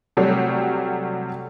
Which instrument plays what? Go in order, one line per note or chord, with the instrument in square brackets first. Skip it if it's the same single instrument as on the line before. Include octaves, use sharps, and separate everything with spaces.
[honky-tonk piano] C3 F#3 G3 A3